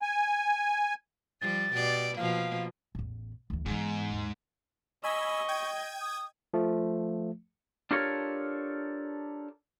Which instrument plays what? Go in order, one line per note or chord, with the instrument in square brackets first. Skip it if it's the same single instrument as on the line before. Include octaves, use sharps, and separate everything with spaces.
[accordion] G#5
[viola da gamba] F3 G3 [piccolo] A6
[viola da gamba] B2 G4 D5
[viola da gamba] B2 F3 A#3 [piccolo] F5
[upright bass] A1 E2
D2 E3
[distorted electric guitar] G#2 [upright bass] E3 B3
[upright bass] D#2
[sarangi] D#5 [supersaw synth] G#5 B5 E6 [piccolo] C#6
[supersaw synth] G5 G#6 D#7
[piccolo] D#6
[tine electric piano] F3 A3
[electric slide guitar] D4 F4 G4 A4 A#4 C#5